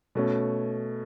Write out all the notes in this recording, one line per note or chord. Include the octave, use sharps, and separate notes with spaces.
B2 A3 C#4